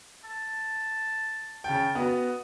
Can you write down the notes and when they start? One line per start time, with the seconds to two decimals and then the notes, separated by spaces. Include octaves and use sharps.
0.24 A5
1.64 C#3 G5 A5
1.95 B3 F#4 D#5